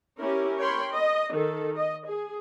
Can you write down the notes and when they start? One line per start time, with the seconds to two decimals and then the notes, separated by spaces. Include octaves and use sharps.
0.19 C#4 E4 G4 A#4
0.60 A#4 C#5 G5 B5 C6
0.94 D#5
1.33 D#3 A4
1.77 D#5
2.07 G#4